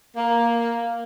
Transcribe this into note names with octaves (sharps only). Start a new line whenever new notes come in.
A#3